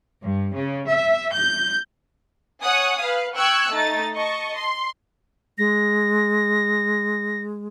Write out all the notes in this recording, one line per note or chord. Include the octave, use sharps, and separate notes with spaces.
G2
C#3
E5
G6
C#5 F#5 G#5 D#6
B4 F5
G5 C#6 E6 F#6 G#6
A3 D#4 A6
D#5 A5 C#6
C6
G#3 A#6